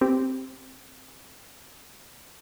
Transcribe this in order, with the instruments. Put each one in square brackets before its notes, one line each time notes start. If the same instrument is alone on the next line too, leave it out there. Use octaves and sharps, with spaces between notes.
[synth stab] C4 G4